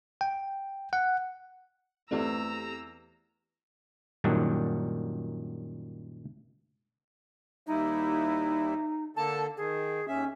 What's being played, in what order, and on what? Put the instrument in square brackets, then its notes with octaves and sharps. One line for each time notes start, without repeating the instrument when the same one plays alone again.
[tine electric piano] G5
F#5
[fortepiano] E2 B3 D5 [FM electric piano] A3 C4 G4 [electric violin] A#5 E6
[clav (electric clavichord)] F#2 A#2 D#3 F#3 G3 D4
[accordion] D#2 G3 E4 [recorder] D#4
[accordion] D3 A#3 A4 [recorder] A5
[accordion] D#3 [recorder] G#4
[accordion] D#2 E5 [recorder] C#4